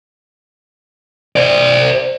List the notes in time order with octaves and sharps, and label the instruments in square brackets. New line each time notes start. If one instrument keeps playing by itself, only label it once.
[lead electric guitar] C5 D5